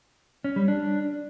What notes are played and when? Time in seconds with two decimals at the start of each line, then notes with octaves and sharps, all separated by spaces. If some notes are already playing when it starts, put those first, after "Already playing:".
0.44 C#4
0.56 G3
0.68 D4